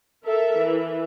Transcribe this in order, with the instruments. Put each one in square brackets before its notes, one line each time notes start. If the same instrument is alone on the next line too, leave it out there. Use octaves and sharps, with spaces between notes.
[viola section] A4 A#4 E5
E3